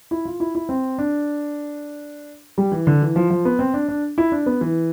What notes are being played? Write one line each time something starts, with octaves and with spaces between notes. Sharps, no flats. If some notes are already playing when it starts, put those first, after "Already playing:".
E4
F4
E4
E4
C4
D4
G3
E3
D3
E3
F3
F3
B3
C4
D4
D4
E4
D4
B3
E3